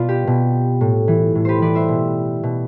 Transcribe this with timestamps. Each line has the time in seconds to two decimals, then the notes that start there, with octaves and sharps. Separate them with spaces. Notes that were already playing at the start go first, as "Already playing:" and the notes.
Already playing: B2 F4 B4 D5
0.09 G4
0.27 B2
0.81 A2
1.08 E3
1.35 A2
1.45 G4 B4 C5
1.61 E3 B4 D5
1.75 C5 E5
1.89 B2
2.43 B2